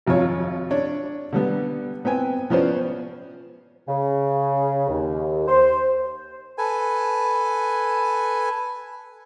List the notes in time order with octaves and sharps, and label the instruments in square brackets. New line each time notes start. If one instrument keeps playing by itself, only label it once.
[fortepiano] G#1 F2 F4 C#5
D4 C#5
D3 G3 B3
B3 C4 G5 G#5
F3 B3 C#4 C5 D5
[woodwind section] C#3
D#2
C5
[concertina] A4 B4 G#5